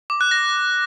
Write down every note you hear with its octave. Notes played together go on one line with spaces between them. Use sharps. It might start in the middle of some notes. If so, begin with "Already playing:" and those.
D6
F#6
A#6